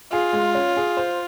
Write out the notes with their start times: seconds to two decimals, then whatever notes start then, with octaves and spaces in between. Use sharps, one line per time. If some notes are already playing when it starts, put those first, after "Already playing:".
0.12 F4 G#4
0.33 G#3
0.55 C#4
0.77 G#4
0.97 C5